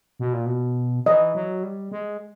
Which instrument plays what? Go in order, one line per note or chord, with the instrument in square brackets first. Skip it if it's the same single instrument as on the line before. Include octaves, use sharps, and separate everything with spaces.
[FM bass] B2
A#2
B2
[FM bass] E3 [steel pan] D#5
[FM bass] F#3
G3
G#3